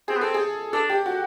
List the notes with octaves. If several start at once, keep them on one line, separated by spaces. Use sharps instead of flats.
C4 G#4
B3
C4 A4
G#4
D4 A4
G4
F#4